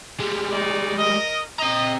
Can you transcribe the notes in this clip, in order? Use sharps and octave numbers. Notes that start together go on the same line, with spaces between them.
G3 G#3
D#4 C#5 D5
A#4 D#5
C4 D#5 A#5